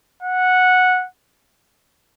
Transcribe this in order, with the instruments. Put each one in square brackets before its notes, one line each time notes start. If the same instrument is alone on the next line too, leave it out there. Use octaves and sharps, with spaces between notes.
[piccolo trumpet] F#5